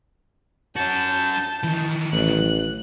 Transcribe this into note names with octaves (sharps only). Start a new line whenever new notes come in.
C#4 F#4 A5 G6
D#3 E3
A1 F#6